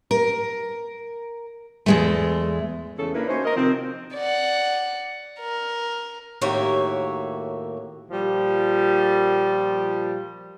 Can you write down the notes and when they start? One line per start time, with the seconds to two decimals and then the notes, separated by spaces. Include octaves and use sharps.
0.11 A#4
1.86 E2 G#3 A3
2.98 E2 C#3 E3 A3 C#4 A4
3.14 A#3 C#4 D4 E4 A#4 B4
3.27 C#4 D#4 F#4 C5
3.44 A#4 D#5
3.56 C3 D#3 F3 C4
4.15 D5 F#5
5.40 A#4
6.41 D#2 A2 A#3 F#4 C#5 E5
8.09 A#2 F3 G3